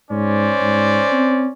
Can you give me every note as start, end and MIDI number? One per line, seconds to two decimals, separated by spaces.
0.10 0.52 44
0.10 1.52 61
0.10 1.52 72
0.10 1.52 74
0.61 1.01 44
1.13 1.47 60